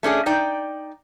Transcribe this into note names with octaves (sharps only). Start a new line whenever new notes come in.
A3 C#4 D4 G#4
D#4 D5 G5